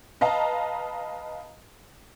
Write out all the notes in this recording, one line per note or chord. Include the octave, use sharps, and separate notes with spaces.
B4 D#5 F5 A5 A#5